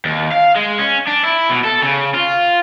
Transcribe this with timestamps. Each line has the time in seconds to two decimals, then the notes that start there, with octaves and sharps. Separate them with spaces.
0.05 D#2
0.32 F5
0.56 G#3
0.78 C#4
1.07 D4
1.24 E4
1.49 B2
1.64 A4
1.82 C#3
2.14 F4